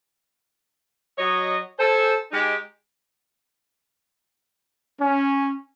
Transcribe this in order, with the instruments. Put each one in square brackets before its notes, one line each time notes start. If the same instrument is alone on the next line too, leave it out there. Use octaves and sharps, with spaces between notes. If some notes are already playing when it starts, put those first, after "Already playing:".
[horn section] F#3 C#5 D#5
A4 C5 G#5
G#3 D#4 G4
[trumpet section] C#4